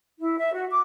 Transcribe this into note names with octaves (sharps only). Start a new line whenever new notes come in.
E4
E5
F#4
D6